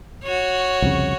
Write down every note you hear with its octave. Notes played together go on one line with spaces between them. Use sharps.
F#4 C#5
C2 F2 C#3